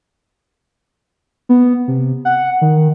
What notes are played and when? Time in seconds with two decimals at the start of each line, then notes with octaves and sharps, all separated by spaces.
1.49 B3
1.88 C3
2.25 F#5
2.61 D#3